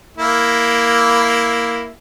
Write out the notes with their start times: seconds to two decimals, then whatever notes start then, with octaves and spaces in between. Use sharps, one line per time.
0.17 A#3 E4